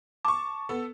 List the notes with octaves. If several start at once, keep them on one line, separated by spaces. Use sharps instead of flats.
A5 C#6 D6
B3 A4